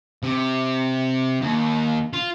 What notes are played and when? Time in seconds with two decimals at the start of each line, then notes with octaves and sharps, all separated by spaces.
0.23 C3
1.41 D#2
2.13 F4